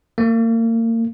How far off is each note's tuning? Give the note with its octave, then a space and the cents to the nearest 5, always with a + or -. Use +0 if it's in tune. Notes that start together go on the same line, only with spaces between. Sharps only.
A#3 -35